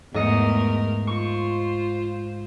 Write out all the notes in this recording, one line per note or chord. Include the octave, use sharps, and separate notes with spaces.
E2 G#2 A3 A#4 D#5 C#7
F4 C5 C#6